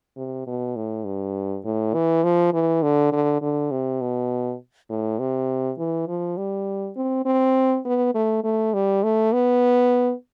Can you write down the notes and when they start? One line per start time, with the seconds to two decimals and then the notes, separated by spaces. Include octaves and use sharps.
0.17 C3
0.47 B2
0.76 A2
1.06 G2
1.65 A2
1.94 E3
2.24 F3
2.53 E3
2.83 D3
3.13 D3
3.41 D3
3.71 C3
4.01 B2
4.89 A2
5.19 C3
5.78 E3
6.08 F3
6.37 G3
6.96 C4
7.26 C4
7.85 B3
8.14 A3
8.44 A3
8.74 G3
9.03 A3
9.33 B3